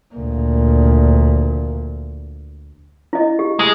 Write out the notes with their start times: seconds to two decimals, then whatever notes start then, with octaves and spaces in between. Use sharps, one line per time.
0.15 D2 A#2
3.13 E4 D#5
3.39 G4
3.59 G#3